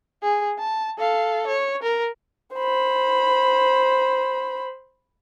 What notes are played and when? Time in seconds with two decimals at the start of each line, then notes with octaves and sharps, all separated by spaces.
0.22 G#4
0.59 A5
0.99 A4 F5
1.47 C#5
1.83 A#4
2.55 C5 B5